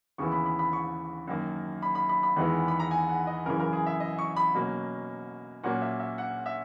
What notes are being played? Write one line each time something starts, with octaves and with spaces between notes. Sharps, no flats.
D#2 C#3 E3 B3 E4 C#6
B5
B5
B5
C#6
F#2 D#3 A#3
B5
B5
B5
B5
E2 D#3 G#3 B3 E4
B5
A#5
G#5
F#5
D#5
F#2 C#3 E3 A#4
A#4
G#4
E5
D#5
C#6
B5
B2 F#3 A#3 C#4
A#2 F#3 A#3 C#4 F#5
E5
E5
F#5
E5